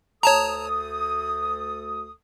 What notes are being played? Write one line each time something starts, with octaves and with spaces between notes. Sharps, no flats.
D2 A4 C#5 A5 A#5 D#6